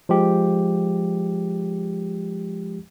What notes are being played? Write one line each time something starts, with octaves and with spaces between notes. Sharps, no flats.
F3 G#3 G4